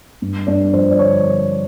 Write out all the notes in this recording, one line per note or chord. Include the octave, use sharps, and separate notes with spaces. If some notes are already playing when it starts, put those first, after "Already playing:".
G2
G2 D4 D5
F3 C5
D5
D3 C#5